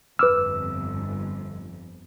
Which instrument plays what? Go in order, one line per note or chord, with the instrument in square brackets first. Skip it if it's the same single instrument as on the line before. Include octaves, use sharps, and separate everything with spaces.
[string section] G1 F2 [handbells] B4 D6 F6 [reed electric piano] E6